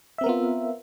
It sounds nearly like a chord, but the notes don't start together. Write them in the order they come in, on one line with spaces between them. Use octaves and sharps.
E5 C4 A#4 B3 F4